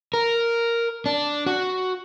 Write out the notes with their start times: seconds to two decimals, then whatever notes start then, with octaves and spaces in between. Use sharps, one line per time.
0.14 A#4
1.06 D4
1.46 F#4